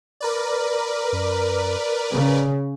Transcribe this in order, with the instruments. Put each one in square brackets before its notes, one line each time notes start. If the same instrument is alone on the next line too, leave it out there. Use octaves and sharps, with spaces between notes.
[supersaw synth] A#4 B4 D5
[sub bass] F#2
[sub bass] D1 [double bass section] C#3